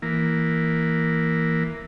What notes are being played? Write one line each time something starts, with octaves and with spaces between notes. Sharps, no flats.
E3 A#3